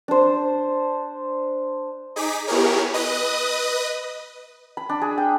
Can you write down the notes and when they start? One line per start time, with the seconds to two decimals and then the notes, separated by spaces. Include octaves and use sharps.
0.08 D4 C5
2.16 D#4 G#4 D6 B6
2.47 B3 E4 G4 G#4 A#4 C#5
2.93 B4 D#5 D#6
4.77 B5
4.89 D4
5.02 G#4
5.18 G5